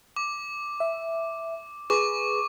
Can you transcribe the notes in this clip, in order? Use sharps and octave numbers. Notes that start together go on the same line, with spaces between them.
D6
E5
G#4 B4 C#6 D6